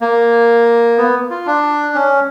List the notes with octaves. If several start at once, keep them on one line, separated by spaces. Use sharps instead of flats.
A#3
B3
F4
D4
C#4